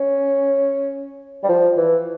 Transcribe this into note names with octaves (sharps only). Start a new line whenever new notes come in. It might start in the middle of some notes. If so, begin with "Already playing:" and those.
Already playing: C#4
G3
F3
E3